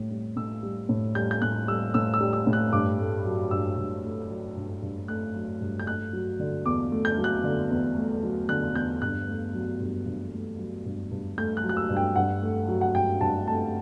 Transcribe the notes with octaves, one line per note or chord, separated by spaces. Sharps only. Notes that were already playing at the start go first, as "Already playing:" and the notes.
Already playing: A2 G3
G3
A2 E6
G3
A2
G3 G6
G6
A2 F#6
G3 E6
A2 E6
E6
G3
E6
A2
F#6
G2 D6
A3
F#3
G2 E6
G2
A3
F#3
G2
G2
A3 F#6
F#3
G2
G6
A3 F#6
F#3
D3
E2 D6
A3
G6
F#3
F#6
D3
E2
A3
F#3
D3 F#6
E2 G6
G2 F#6
A3
F#3
G2
G2
A3
F#3
G2
G2
A3 G6
F#6
F#3
F#6
E6
G2
G5
G2 F#5
A3
F#3
F#5
G2 G5
G2 A5
A3 A5